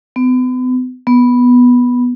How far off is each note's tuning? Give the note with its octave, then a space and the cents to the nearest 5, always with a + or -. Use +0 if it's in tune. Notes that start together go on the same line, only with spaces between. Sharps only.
B3 +40
B3 -5